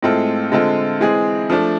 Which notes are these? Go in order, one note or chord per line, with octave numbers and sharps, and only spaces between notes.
A2 G#3 C4 F4 A4
D3 G#3 C4 F4 A4
E3 G#3 C4 G#4
F3 A3 D4